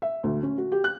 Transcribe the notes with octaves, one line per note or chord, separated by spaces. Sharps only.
E5
D2
C#4
F#4
G4
F#6